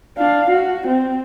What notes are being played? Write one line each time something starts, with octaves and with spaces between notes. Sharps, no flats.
D4 F5
F#4
C4